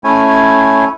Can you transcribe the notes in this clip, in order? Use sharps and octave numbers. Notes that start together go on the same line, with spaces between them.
A3 C#4 E4 C#5 G#5